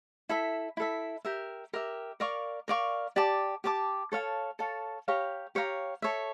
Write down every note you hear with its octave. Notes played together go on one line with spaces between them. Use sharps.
E4 A4 E5
E4 A4 E5
G4 A#4 E5
G4 A#4 E5
A#4 D5 F5 C#6
A#4 D5 F5 C#6
G4 D5 A5 D6
G4 D5 A5 D6
A4 C#5 F5 A5
A4 C#5 F5 A5
G4 C#5 F5 A#5
G4 C#5 F5 A#5
A4 C#5 E5